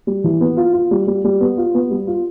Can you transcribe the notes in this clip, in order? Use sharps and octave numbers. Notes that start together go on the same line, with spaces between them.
G3
E3
B3
F4
F4
G3
G3
G3
B3
F4
B3
G3
F4